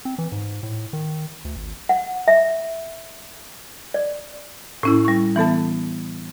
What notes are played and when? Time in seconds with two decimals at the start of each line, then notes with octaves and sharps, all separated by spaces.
0.05 C4
0.18 E3
0.32 G#2
0.63 A2
0.93 D#3
1.45 D2
1.56 G#1
1.89 F#5
2.28 E5
3.94 D5
4.83 A2 C#4 E4
5.05 G3 C#6
5.36 E3 B3 A4 A5